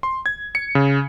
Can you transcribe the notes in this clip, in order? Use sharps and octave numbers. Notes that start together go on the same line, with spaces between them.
C6
G#6
C#7
C#3